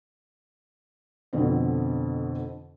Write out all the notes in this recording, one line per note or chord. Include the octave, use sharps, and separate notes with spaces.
F2 B2 D3 C4